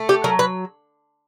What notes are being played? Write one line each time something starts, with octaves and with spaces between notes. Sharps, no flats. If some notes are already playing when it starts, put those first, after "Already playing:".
Already playing: A3
G4
F#3 A#4
B4